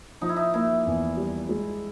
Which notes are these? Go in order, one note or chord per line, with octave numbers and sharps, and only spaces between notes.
F3 D#4
E4
D#4
A#3 E4
E2
G3
G#3